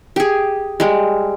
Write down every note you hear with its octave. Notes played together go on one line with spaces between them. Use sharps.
G4 G#4
G3 G#3